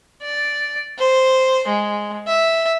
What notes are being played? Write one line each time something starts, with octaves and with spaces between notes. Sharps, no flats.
D5
C5
G#3
E5